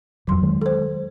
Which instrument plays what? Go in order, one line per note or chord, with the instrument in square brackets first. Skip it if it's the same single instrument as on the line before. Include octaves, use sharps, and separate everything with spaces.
[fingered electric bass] D#1 F2 F3 [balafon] F#3 C6
[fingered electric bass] D#3 G#3
[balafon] A4 C5